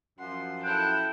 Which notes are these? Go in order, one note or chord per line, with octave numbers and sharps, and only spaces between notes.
F#2 F3 F#5 C6
E4 A4 G5 F#6